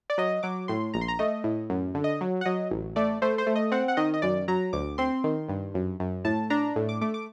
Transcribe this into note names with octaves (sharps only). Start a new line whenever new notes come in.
D5
F#3 D#5
F#3 D6
A2 C6
A#1 A#5
C6
A#5
A3 D#5
A2
F#2
D3
D#5
F#3
F#5
F#3 D#5
A1
A3 D5
A3 C5
C5
A3
D#5
C4 F#5
F#5
D#3 D#5
D#5
F#2 D5
F#3 A#5
D2 D6
C4 C6
D#3
G2
F#2
F#2
A2 A5
D4 A#5
A2
D6
A3 D6
D6